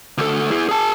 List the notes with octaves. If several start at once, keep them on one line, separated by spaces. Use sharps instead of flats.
D2 A4
E4 G#4
G#4 A5